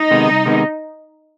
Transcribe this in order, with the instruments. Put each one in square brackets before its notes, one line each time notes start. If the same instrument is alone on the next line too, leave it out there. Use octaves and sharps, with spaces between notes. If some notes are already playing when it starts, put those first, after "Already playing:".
Already playing: [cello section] D#4
[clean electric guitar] C3 D#3 G#3 B3
C2
C3 D#3 G#3 B3